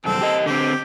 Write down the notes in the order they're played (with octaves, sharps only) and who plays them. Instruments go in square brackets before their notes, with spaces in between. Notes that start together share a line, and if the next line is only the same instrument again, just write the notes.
[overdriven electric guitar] C2 F#2 [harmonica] C4 A4
[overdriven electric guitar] G4 D#5
[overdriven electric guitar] D3 C4 [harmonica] G4